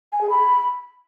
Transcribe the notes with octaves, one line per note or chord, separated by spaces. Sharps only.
G#5
G#4
B5